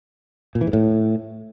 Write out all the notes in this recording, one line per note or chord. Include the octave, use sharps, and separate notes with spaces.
A#2
E3
G#2
A2